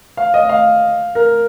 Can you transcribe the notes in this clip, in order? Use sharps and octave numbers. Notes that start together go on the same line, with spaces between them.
F5
D#5
F5
A#4